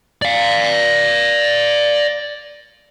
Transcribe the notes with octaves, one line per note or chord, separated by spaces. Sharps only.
D5 F5